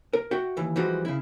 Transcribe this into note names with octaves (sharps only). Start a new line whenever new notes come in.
A#4
F#4 E5 F#5 G5
D#2 E3
E3 F3 G3 G#3 F#4
C#3 E4